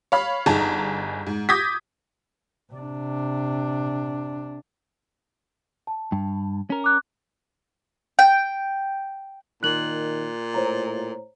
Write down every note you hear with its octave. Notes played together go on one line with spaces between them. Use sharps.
C#5 F5 B5
G1 D#4 G#4 A5 A#5
G#2
D6 D#6 G6 G#6 A#6 B6
C3 D4
A5
G2
C#4 A#4
D6 F#6
G5
A#2 D#3 F#6 F#7
A2 C5 C#5 A#5